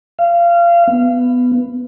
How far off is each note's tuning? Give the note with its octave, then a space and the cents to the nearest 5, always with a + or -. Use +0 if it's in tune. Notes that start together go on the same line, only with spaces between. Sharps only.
F5 -25
B3 +10